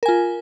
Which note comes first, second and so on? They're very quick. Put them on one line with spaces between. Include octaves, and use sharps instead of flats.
A#4 G#5 F4